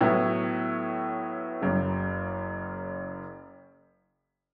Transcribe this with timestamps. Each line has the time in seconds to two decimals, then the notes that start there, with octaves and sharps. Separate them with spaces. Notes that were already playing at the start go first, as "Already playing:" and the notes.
0.01 A2 F#3 B3 E4
1.61 F#1 F#2 C#3